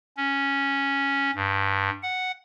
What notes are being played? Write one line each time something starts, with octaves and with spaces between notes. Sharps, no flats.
C#4
G2
F#5